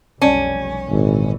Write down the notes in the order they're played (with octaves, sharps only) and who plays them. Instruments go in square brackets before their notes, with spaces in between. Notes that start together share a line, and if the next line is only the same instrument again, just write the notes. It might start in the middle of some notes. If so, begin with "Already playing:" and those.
[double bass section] F1 B1 G3 [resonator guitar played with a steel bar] C#4 [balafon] D5 A5
[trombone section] G#1 [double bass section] A#2 E3